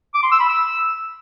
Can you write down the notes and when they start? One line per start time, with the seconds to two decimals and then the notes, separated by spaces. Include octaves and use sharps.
0.14 D6
0.23 C6
0.31 E6
0.40 B5
0.49 E6